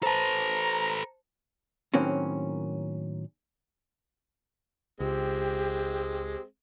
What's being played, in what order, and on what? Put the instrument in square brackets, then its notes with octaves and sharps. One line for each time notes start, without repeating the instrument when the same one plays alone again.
[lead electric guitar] A4 B4 [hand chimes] C5 A5 [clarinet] A#5
[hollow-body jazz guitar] A2 D#3 F#3 A#3 C4 C#4
[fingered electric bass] C#2 [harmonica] G#3 C4 [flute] G4